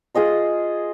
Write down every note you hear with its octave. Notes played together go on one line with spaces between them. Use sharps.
F4 G#4 D#5 C6